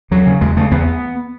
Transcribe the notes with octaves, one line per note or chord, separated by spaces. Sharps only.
E2 F#3
C#3
E2 G#3
C#3 A3
E2 B3